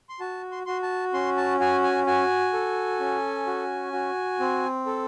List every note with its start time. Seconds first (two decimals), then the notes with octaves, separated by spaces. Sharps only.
0.09 C6
0.20 F#4 A5
0.52 C6
0.66 F#4 C6
0.83 A5
1.14 C#4 C6
1.37 A5
1.60 F#4 G#5
1.83 G#5
2.06 F#4 G#5
2.53 A4
3.00 C#4
3.47 F#4
3.93 F#4
4.40 C4
4.86 A4